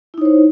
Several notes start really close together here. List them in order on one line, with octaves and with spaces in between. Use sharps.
E4 D#4 C#5 C5